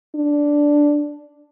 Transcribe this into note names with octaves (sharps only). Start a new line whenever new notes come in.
D4